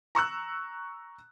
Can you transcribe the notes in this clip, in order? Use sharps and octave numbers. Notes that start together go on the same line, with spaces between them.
A#5 C#6 E6 F#6